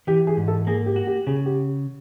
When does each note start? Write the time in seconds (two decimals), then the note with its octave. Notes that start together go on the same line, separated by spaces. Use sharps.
0.07 E3 G4
0.27 G#4
0.37 G#2
0.48 A4
0.67 A#3 G#4
0.86 G4
0.96 F#4
1.07 G4
1.27 C#3 G#4
1.46 G4